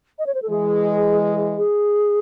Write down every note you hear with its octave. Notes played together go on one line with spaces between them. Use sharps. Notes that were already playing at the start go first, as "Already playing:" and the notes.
D#5
C#5
C5
A4
E3 G#3 G#4
G#4